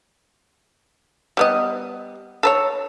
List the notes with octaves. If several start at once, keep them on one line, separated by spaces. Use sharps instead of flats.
G3 B3 D#5
A4 B4 C#5